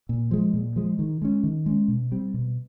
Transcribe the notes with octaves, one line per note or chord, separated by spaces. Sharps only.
A#2
F3 G#3
A#2
F3 G#3
D#3
G#3 C#4
D#3
G#3 C#4
B2
G3 C4
B2